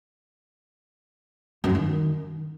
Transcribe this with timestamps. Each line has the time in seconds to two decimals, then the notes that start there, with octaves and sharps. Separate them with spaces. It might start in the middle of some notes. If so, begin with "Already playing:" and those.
1.64 F#2
1.69 F#3
1.75 D#3